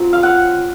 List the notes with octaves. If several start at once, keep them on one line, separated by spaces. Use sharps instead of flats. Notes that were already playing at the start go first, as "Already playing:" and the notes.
Already playing: F#3 C4 F4
F5
F#5